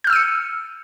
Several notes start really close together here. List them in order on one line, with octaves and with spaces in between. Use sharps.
G6 F6 E6 D#7 C#7